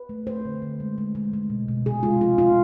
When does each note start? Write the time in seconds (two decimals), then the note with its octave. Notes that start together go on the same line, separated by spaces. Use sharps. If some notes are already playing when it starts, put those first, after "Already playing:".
Already playing: B4
0.09 A3
0.27 A3 C5
0.45 D3
0.62 D3
0.80 G#3
0.98 G#3
1.15 G#3
1.33 G#3
1.50 B2
1.68 B2
1.86 C3 G#4
2.03 G#3 F4
2.21 F3 F4
2.38 F3 F4